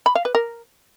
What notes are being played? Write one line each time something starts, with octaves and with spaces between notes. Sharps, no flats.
B5
F5
B4
A#4